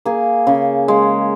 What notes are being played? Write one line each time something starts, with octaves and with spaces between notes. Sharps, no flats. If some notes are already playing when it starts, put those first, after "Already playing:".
A#3 G#4
C#3
G#3